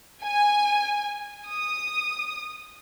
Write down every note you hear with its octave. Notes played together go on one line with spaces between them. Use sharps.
G#5
D#6